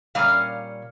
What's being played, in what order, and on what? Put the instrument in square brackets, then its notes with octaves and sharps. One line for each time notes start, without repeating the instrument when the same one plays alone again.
[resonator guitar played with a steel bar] A#2 G3 C#4 F5